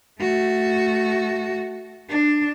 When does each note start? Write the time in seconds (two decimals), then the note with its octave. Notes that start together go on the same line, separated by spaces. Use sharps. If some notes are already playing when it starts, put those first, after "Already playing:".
0.21 A3 F#4
2.09 D4